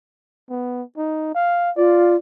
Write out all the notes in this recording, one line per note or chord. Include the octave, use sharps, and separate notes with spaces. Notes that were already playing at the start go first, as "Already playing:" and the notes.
B3
D#4
F5
F4 D5